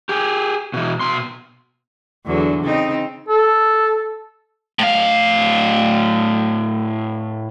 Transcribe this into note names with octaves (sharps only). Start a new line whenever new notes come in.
G4 G#4
B2 E3
B2 C6
E2 D3 F#3
C#3 C4 D#4
A4
A2 F5